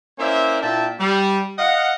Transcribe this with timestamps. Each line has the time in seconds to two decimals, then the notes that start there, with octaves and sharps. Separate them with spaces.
0.19 A#3 C#4 E4 C5 D5 E5
0.61 A#2 D4 E4 E5 G5 A5
1.00 G3
1.59 D#5 F5 F#5